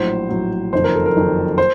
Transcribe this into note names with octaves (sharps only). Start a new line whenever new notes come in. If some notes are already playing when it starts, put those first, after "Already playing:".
Already playing: A#1 A2 F#3 C5
A#1 A2 F#3
F#1 F2 D#3 C5
A#4
A4
A#4
F#1 F2 D#3
C5